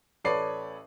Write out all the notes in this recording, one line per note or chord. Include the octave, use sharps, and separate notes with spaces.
A1 A4 B4 C#5 D5 C7